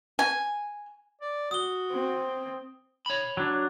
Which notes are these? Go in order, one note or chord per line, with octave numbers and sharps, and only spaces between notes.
G#5
D5
F#4 D#6 G7
C4
C#5 B5
F#3 D4